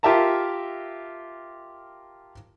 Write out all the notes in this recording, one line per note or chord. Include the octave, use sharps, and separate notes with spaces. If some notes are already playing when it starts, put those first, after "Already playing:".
F4 G4 A#4 E5 A5 A#5